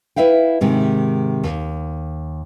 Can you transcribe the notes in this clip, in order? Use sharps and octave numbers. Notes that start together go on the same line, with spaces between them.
E4 B4 E5 F5 G5
G#2 C3 D#3 G#3
D#2